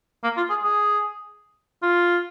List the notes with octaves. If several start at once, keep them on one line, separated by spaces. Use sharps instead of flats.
A#3
F4
G#4
G#4
F4